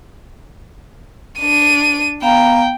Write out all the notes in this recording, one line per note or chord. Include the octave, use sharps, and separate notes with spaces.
D4 D#7
B3 F5 G5 A#5